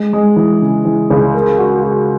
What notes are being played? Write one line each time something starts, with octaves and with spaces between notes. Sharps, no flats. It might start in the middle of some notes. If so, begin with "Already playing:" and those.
Already playing: G#3
G#3
E3
C#3
E3
C#2
A#4
F#4
F#4